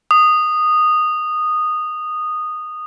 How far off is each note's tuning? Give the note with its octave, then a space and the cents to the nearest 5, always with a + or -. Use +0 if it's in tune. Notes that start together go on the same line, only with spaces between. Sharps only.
D#6 -15